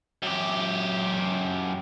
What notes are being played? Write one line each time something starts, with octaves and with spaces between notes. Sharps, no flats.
F#2 G4